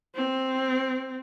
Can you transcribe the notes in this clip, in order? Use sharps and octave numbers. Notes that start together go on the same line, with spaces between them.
C4